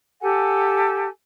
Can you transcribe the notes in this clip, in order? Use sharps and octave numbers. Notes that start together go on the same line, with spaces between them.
G4 A4 F#5 G#5